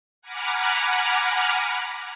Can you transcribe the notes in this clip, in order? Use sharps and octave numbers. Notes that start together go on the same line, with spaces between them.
F#5 G#5 A#5 B5 D6 F6